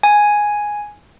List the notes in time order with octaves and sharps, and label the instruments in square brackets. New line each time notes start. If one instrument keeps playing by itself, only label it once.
[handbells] G#5